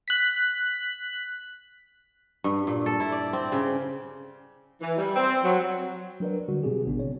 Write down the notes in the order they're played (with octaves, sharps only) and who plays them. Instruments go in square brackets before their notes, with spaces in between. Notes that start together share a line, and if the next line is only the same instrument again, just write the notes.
[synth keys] F#6 B6
[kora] G2
A#2
A4
E4
D5
C4
C#3
[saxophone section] E3
G3
C4
F#3
[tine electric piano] F#3 D4 A#4 B4 D5
D3 G3 F#4
B2 C4 G4 G#4
A1 C#3 B3 D4
C4 C#5